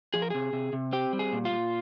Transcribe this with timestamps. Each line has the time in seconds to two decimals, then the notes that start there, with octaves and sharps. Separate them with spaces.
0.14 F3 G#4
0.22 A#4
0.30 C3 G#4
0.53 C3
0.73 C3
0.93 C4 G4
1.13 G3
1.19 G#4
1.33 A#2
1.45 F4
1.51 A#2